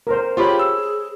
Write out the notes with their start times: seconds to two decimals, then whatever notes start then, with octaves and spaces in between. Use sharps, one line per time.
0.07 A#4 C5
0.37 F4 G4 G#4 C5 C#5 B5
0.59 E6